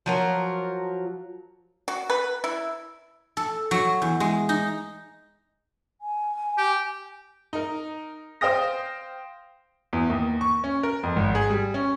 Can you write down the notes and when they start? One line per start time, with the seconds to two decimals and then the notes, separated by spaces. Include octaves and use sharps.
0.06 F3 F#3 A#4
1.88 F#4
2.10 B4
2.44 E4
3.37 A4
3.71 F#3
4.02 E2
4.20 G#3
4.49 D#4
6.01 G#5
6.58 G4
7.53 D#4 A#4
8.41 C5 F5 G5 D#6 A#6
9.93 E2
10.10 D#2
10.41 C#6
10.64 C#4
10.83 A#4
11.03 F2
11.16 G#1
11.35 G#4
11.50 G3
11.74 C#4